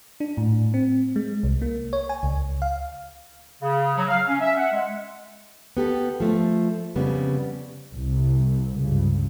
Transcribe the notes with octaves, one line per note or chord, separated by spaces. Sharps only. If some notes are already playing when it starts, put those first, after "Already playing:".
D4
A2
C4
G#3
C2
A#3
C#5
G#5
C#2
F5
C#3
F#3
F5
C#4
E5
F#5
G#3
B3 G4 A4
F3 A3
F2 C#3 G3 B3
C2
C#2 G2